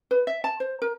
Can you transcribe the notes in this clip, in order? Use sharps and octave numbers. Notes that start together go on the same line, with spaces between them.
B4
E5
A5
C5
A#4